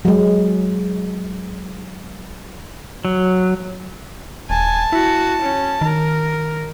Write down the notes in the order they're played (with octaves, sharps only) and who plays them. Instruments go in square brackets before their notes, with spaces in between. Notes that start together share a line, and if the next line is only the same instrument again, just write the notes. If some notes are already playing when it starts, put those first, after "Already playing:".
[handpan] F#3 G#3
[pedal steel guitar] F#3
[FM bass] D#1 [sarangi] G#5 [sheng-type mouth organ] A5
[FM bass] E4 [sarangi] F#4
[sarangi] C#4
[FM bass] D#3 [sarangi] A#4